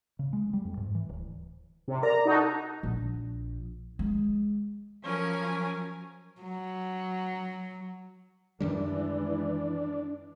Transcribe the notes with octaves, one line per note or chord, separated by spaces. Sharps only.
C#3
G#3
G3
F2
G#2
E3
D1
C3
A#4 D5 A#5
D#4 F#4 A4
A#1
G#3
F3 F#3 C#4 A#4 G#5
F#3
F#2 D#3 E3 G3 G#3 D4